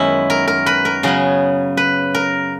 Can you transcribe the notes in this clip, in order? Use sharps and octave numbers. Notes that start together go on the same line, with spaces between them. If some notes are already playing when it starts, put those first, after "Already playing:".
Already playing: F#2 D#3 G#3 B3 C#4 E4
A#4
A#4
B4
A#4
C#3 F#3 B3 G#4
B4
A#4